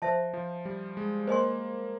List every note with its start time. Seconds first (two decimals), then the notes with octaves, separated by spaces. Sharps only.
0.02 F3 C5 E5 A5
0.34 F3
0.65 G3
0.97 G#3
1.27 A#3 C5 D#5 G#5 C6